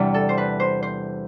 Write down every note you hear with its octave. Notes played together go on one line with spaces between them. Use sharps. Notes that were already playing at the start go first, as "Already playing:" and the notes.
Already playing: E2 C3 G3 D4
A4
C5
B4
C5
C5